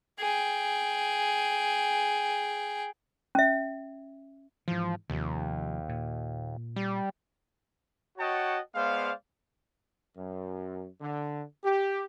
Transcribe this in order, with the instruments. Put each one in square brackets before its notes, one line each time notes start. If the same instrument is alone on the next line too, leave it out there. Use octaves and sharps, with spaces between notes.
[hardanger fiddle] G#4 G5
[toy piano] C#4 E5
[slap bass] G#2 E3 [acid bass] F3
[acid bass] D#2 [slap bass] C3 F3
[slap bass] A#2
[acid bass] G3
[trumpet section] F#4 C#5 D#5 F#5 G5 A5
G#3 B3 C5 D5 F5
[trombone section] F#2
D3
G4